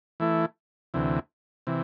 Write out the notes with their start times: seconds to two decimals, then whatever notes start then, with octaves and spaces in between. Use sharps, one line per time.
0.20 E3 A3 E4
0.94 D2 C3 E3
1.67 C3 E3